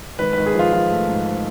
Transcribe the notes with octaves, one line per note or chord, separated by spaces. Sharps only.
G#1 B4
G#1 B4
G#4
F3 F4
F3 F4
A3
G#2